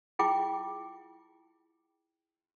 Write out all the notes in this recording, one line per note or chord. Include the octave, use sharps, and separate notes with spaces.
E4 F4 G#4 G5 D6